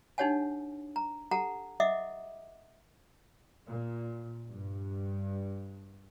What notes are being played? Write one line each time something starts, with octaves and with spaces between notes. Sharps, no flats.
D4 D#4 G4 C#5 F#5 G#5
A#5
G4 A4 F#5 A5 A#5
D#5 E5 F#5 D6 D#6
A#2
G2